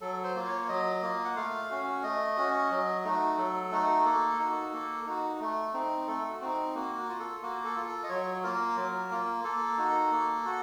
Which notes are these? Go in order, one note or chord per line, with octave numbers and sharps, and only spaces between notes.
F#3 A4
C5
A#3 F4
C#5
F#3 D#5
A#3 F4
F#5
A3 F5
C#4 F#4
A3 D#5
C#4 F#4
F#3
A3 D#4 F#4
F#3 A4
A3 D#4 F#4
A#3 A4
D#4 F#4
A#3
D#4 F#4
A3
C4 D#4
A3 A4
F#4
C4 D#4
A#3 F#4
F#4
F4
A4
A#3 F#4
A4
F4
A4
D#5
F#3 C#5
A#3 F4 A#4
F#3
A#3 F4
A#3 A4
D#4 F#4
A#3
F#4